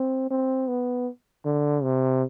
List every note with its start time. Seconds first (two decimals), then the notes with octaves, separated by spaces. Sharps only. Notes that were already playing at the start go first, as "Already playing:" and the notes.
Already playing: C4
0.30 C4
0.68 B3
1.45 D3
1.83 C3